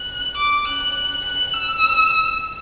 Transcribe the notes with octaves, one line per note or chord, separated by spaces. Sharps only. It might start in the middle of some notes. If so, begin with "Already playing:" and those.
Already playing: F#6
D6
F#6
F#6
E6